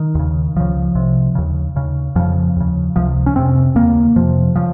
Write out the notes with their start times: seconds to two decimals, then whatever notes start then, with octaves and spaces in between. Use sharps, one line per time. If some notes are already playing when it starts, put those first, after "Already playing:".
Already playing: D#3
0.15 D#2 C#3
0.56 C#2 C#3 F3
0.95 C2 C3
1.35 D#2 C#3
1.76 D#2 C#3
2.16 F2 C#3 F3
2.56 D#2 C#3
2.96 C#2 C3 F3
3.26 C#4
3.36 F2 C3 C4
3.75 D#2 C#3 A#3
4.16 F2 C3 F3
4.56 C#3 F3